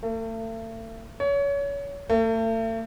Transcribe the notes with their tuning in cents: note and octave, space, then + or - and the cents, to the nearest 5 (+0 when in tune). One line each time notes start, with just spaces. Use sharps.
A3 +40
C#5 +30
A3 +40